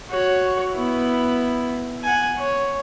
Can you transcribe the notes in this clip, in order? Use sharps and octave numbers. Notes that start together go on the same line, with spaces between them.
F#4 C#5
B3 E4
F#5 G#5
C#5